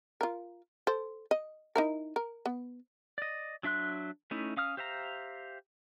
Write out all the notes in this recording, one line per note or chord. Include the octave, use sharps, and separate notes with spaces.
F4 A#4
A4 C5
D#5
D#4 E4 A#4
A#4
B3
D5 D#5
F#3 D4 E5 C6 F#6
A3 C#4 D#4 E4
C#4 F5 D#6 F6
G4 C5 E5 F5 A#5